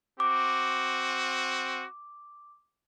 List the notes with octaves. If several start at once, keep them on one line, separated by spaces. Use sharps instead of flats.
C4 F#4 D6